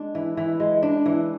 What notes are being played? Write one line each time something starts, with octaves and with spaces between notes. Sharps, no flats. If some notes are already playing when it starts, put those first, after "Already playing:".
Already playing: G#3 D4
E3
E3
G#3
D4
E3